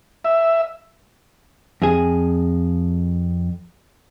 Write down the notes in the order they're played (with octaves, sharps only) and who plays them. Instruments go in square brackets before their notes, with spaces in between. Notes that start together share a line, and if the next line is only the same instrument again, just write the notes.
[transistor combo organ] E5
[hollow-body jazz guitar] F2 G#4